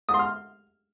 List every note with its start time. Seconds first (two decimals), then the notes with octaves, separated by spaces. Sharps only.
0.09 D#6
0.14 C6
0.19 F6